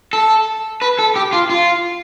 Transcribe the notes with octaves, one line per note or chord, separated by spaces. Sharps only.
A4
B4
A4
G4
F4
F4